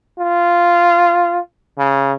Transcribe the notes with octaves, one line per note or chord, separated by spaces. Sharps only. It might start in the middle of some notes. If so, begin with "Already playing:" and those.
F4
C#3